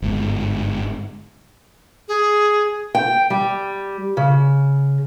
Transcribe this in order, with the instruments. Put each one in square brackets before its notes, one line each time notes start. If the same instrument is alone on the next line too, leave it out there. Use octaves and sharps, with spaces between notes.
[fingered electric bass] G1 G#2
[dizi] G#4
[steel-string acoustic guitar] G5
G3
C#3